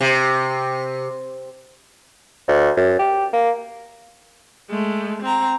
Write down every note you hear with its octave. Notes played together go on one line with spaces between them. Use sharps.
C3
D2
F#2
G4
A#3
G#3 A3
C4 A#5